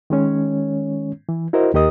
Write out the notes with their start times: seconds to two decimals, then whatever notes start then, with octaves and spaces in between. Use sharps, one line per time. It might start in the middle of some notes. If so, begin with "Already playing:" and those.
0.10 D#3 G#3 C#4 C#5
1.29 E3
1.53 E4 F#4 A#4 C5 D#5
1.74 D#2 G4 A#4 D#5 D#6